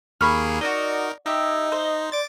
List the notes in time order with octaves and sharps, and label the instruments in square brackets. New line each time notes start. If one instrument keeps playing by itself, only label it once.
[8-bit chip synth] D#2 A#3 G#4 [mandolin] B5 C#6 F6
[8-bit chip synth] D#4 A#4 [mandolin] F#4 D#5 [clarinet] D5
[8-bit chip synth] D#4 [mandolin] E4 G4 [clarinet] D#5
[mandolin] C5
[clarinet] D5 [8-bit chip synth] D6 A6